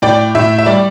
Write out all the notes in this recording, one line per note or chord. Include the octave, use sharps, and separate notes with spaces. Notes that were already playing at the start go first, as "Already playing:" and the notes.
A2 D5 G5
A2 E5
E5
G3 D5